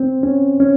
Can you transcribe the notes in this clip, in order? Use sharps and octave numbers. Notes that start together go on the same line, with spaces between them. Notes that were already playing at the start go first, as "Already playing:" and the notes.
Already playing: C4
C#4
C#4